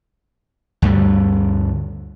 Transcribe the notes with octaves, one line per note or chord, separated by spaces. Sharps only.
D2 G2 D3 G3